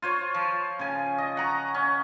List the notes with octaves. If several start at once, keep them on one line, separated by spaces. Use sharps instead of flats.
F4 C5 C#5
F3
C#3 G#5
D#5
F#5 A#5 C#6
C#4